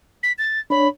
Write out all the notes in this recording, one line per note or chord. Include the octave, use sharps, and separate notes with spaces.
B6
A6
D4 C#5 B5